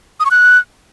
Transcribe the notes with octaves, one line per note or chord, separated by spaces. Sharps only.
D#6
C#6
F#6